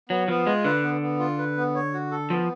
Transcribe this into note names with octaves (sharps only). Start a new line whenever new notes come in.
F#3 B3
F3 B3
G#3 F4
D3 B4
B3
B3
F4
B4
B3
C#5
F#4
A4
F3 B3